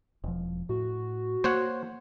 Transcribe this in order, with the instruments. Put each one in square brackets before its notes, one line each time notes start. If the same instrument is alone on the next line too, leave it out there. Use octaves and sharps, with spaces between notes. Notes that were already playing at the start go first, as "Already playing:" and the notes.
[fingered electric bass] E1 F3
[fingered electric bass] A2 [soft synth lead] F#4
[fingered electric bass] A#3 [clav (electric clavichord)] C5 C#5 F#5